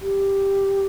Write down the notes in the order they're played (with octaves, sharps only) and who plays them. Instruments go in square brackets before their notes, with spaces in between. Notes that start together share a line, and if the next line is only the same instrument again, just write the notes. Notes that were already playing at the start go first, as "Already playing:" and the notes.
[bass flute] G4